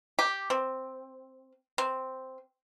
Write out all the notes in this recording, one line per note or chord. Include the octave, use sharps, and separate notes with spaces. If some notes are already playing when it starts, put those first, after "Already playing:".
G4
C4
C4